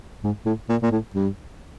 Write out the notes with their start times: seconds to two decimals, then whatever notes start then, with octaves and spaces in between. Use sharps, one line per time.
0.24 G#2
0.46 A2
0.69 A#2
0.82 A#2
0.91 A2
1.14 G2